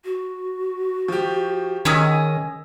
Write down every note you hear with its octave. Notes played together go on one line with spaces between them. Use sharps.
F#4
F3 G4
D#3 C#4 G#4 D#5 A#5 E6 B6